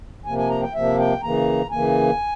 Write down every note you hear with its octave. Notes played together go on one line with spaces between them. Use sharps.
C3 F3 A#3 G#5
G#5
A#5
G5
C3 F3 A#3 E5
G5
C#3 E3 A#3 A#5
C#3 E3 A#3 G#5